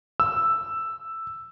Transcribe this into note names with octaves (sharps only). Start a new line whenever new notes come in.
E6